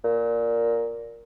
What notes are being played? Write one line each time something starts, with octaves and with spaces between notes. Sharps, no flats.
A#2